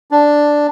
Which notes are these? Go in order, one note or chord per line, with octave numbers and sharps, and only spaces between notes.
D4